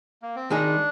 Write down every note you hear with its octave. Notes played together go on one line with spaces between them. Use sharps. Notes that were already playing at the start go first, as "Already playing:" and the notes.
A#3
C4
D#3 G#3 D4 D#4 G#4